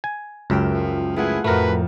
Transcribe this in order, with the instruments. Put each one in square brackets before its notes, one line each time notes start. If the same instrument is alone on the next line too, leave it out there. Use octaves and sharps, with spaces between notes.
[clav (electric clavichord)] G#5
[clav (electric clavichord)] C#2 F#2 [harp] A#4 E5 G5
[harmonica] F3
[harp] A3 F4 F#5 [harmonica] E4 G#4 B4
[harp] F2 A2 [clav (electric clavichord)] A3 A#4 [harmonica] F#4 B4